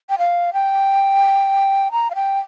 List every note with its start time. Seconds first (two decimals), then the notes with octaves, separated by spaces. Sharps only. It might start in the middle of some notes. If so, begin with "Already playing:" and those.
0.09 G5
0.18 F5
0.53 G5
1.92 A#5
2.10 F5
2.15 G5